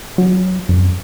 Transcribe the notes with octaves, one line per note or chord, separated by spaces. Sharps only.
F#3
F#2